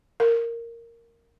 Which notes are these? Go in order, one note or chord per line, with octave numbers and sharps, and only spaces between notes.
A#4